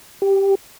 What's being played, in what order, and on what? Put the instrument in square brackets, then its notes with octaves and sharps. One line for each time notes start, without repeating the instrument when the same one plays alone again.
[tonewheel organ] G4